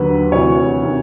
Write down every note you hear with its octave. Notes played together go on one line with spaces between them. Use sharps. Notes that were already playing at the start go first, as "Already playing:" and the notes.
Already playing: D#2 D3 F#3 B4
D2 C3 E3 C#5
C3 D#3